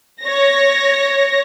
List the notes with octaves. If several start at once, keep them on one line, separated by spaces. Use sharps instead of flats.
C#5 A#6